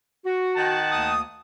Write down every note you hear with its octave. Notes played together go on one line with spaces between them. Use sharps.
F#4
D#3 F#5 A5
D2 A#3 D#6